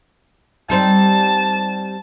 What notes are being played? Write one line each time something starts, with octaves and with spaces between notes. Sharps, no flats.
G3 C4 D#4 A5